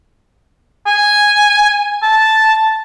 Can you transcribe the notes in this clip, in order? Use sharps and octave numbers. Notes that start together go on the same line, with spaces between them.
G#5
A5